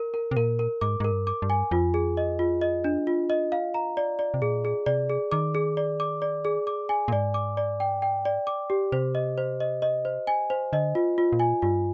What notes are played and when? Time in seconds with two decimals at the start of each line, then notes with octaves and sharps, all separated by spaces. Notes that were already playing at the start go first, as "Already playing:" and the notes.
Already playing: A#4
0.14 A#4
0.31 C3
0.36 A#2 A#4
0.59 A#4
0.81 G#2 D6
1.00 G#2 A#4
1.12 G2
1.27 D6
1.42 G2
1.50 G#5
1.71 F2 F4
1.94 G#4
2.17 D#5
2.39 F4
2.61 D#5
2.84 D4
3.07 F4
3.30 D#5
3.52 F5
3.74 A#5
3.97 D5
4.19 D5
4.34 C3
4.42 A#2 G#4
4.65 G#4
4.86 C3 D5
5.10 G#4
5.32 D#3 D6
5.55 G#4
5.77 D5
6.00 D6
6.22 D5
6.45 G#4
6.67 D6
6.89 G#5
7.08 A#2
7.12 G#2 D5
7.34 D6
7.57 D5
7.80 G5
8.02 G5
8.25 D5
8.47 D6
8.70 G4
8.92 C3 C5
9.15 D#5
9.38 C5
9.60 D#5
9.82 D#5
10.05 C5
10.27 G#5
10.50 C5
10.73 D3 D#5
10.95 F4
11.18 F4
11.32 A#2
11.40 G#5
11.62 G2 F4